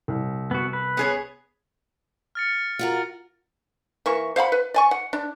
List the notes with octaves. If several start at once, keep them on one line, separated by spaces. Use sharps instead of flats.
C2
B3 F#4
B4
B3 G#4 C#5
F6 A6 C#7
F4 F#4 A#4
E3 A#3 C#6
C5 F5 F#5 B5
B4
D5 G#5 C#6
F#5
D4